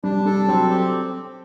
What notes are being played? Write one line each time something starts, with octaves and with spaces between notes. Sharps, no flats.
G3 D4
G3 A4
F#3 C4
G4